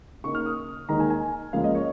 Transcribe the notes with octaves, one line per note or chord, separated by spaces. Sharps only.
C#3 A#3 D#4 C#6
F6
D#6
D#2 D#3 G#3 D#4 A#5
G#5
G#5
C#2 C#3 F3 A#3 F5
D#5
C#5